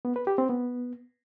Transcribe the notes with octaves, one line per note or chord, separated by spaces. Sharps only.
B3
B4
G4
C4
B3